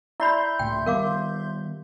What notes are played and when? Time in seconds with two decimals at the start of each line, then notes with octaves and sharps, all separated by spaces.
0.20 E4 D5 E5 B5 C6 G6
0.59 C#2 A2 G5
0.86 D#3 G3 B3 A#4 F5 D6